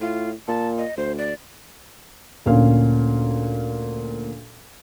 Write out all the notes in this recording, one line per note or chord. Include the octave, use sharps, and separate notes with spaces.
A2 F4
A#2 A5
D#5
D2 C5
D5
D2 A#2 C#4 F5